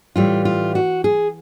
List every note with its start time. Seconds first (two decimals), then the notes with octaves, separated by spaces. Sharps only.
0.16 A2 E3 G3 F4
0.45 F4
0.75 F#4
1.04 G#4